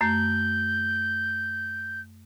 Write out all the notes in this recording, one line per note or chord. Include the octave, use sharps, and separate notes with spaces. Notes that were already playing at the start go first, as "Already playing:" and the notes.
F#2 A3 G6